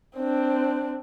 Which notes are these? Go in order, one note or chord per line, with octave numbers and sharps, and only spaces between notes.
C4 D4